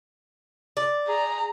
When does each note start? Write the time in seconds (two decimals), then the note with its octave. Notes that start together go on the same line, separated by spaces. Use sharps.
0.77 D5
1.08 G#4 A#5